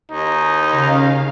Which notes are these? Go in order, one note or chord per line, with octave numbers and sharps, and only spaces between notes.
D#2 D#4
C#3 F5